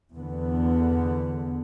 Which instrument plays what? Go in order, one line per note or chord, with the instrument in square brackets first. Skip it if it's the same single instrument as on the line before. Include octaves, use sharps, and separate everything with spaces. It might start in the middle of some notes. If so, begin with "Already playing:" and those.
[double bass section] E2 D3 B3